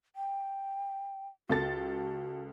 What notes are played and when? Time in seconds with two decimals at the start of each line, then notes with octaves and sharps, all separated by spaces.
0.16 G5
1.50 C#2 F#4 A4 A6